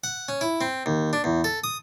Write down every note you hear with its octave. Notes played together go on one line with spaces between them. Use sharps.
F#5
C#4
E4
C4
D#2
D4
E2
A4
D#6